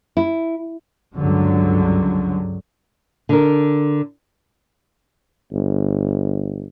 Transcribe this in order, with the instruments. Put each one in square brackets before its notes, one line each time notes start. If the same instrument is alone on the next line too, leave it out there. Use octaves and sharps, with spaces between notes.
[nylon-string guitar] E4
[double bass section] C#2 G2 D3 F#3
[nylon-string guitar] D3 A#4
[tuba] G1